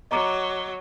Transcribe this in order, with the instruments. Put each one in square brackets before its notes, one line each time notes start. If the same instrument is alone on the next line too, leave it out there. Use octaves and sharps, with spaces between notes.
[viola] F#3 [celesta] D#5 A#5 D6